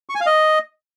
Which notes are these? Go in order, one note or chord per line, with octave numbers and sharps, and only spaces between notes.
C#6
G#5
F5
D#5